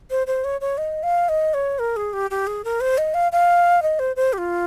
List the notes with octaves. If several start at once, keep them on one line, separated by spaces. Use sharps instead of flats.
C5
C5
C#5
C#5
D#5
F5
D#5
C#5
A#4
G#4
G4
G4
G#4
A#4
C5
D#5
F5
F5
D#5
C5
C5
G4
F4